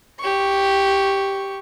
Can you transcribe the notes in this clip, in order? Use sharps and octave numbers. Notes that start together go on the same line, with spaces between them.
G4 C#6